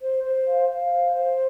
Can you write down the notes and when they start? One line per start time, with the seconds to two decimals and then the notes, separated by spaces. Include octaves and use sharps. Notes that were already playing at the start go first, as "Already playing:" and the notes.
0.01 C5
0.24 C5
0.46 F5
0.68 F5
0.91 C5
1.13 C5